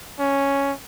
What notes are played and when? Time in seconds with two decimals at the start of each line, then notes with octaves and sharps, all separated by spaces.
0.19 C#4